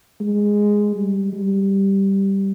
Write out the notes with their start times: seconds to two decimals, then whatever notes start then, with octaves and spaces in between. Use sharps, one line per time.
0.20 G#3
0.96 G3
1.33 G3